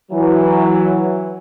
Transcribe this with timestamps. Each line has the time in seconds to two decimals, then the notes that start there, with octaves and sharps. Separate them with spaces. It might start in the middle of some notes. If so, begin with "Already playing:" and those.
0.11 E3 F#3